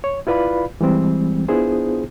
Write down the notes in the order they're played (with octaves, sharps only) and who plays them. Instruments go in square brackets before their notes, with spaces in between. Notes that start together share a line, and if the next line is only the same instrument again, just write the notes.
[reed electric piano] C#5
E4 F4 B4 D5 F5 B5
E3 G3 G#3 C4
B3 D4 E4 F4 G#4 C5